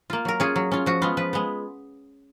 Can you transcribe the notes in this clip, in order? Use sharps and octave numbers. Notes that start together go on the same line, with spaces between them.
A#3 F4
F#3 A#4
C#4 F4 G#4
F#3
C#4 F4
F3 F#4
G#3 B3 F4
F3 B4
G#3 B3